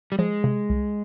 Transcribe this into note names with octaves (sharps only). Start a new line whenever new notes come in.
G3
F3 G#3
C3
C2